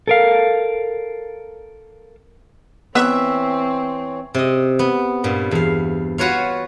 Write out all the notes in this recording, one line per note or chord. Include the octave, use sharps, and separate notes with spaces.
A4 A#4 F5
E3 B3 C4 C#5 E5
C3 D#5
B3
G2 A#2
E2 F5
F4 F#4 B4 C#5 F5